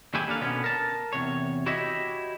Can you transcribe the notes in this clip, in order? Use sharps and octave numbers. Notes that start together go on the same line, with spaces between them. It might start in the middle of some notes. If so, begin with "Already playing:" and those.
D#2 A2 F#3 E4 G4 G#5
A#3 D4 A4 F5
B2 D3 B3 C#4
A#4 A5
E2 C3 C#5
E4 F#4 G4 C#5 D#5 E5